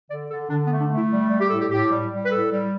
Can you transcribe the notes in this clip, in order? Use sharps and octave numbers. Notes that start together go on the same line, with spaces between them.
D3 D5
D3 A4
D3 D4
B3
A3
D4
A3 E4
G3
G3
G4
A2 A4
G4
A2 G4
G3
G3
B4
A2 A4
G3